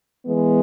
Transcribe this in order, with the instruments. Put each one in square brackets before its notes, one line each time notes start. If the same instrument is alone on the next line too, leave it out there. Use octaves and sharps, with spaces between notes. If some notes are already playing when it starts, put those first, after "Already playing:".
[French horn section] E3 G#3 B3